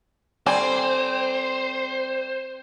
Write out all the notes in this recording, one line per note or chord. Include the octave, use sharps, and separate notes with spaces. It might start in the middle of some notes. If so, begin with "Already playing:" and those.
G3 C4 A4 C5 G#5